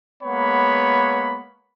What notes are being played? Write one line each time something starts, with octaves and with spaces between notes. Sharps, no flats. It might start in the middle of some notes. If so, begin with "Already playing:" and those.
G#3 A#3 B3 C#5 F#5 B5